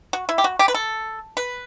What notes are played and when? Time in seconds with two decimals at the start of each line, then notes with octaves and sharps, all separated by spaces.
0.13 F#4
0.29 E4
0.38 G4
0.44 F#4
0.59 G4
0.68 B4
0.75 A4
1.37 B4